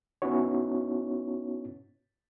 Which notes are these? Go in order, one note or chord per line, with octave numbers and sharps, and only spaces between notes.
B3 C#4 D#4 E4 F#4 C#5